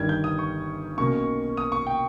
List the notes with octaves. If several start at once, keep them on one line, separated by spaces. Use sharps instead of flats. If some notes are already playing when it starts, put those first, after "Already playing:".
Already playing: G1 G2 D#3 G3 G#6
G6
D#6
C#6
B1 B2 A#3 C#4 C#6
D#6
C#6
G5